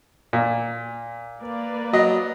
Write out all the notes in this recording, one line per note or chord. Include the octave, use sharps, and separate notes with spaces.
A#2
A#3 B4 D5
F#3 D#5